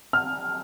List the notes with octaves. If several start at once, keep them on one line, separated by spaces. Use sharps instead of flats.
F6